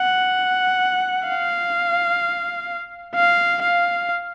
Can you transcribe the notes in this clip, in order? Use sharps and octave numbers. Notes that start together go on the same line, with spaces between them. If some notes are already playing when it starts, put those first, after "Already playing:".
Already playing: F#5
F5
F5
F5